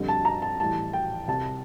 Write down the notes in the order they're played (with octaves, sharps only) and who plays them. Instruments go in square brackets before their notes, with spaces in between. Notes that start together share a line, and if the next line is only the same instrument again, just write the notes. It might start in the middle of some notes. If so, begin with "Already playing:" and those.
Already playing: [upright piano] F2 D3 G3
A5
A#5
A5
A2 E3 G3 A5
G5
C2 C3 G3 A5